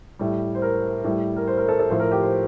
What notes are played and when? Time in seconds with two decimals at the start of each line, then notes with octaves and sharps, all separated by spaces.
0.19 A2 G3
0.55 C5
0.62 A#4
1.04 A2 G3
1.36 A#4
1.47 C5
1.58 A#4
1.69 A4
1.79 A4
1.90 A2 F3 C5
2.00 A#4
2.12 G4
2.22 C5